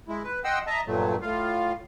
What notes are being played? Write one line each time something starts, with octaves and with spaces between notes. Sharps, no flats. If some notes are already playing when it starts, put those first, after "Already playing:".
G#3 E4
B4
D#5 F#5 G5 C6 E6
D#5 E5 A5 A#5
G2 A#2 F#3 A3
A2 F4 F5